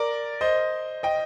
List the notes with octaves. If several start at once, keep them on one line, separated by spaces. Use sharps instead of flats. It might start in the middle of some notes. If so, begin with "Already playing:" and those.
Already playing: A#4 D5
C5 D#5
D#5 G5